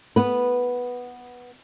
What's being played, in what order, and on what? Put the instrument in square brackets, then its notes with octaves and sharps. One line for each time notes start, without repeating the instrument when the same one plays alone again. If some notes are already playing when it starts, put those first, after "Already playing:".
[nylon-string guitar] B3 B4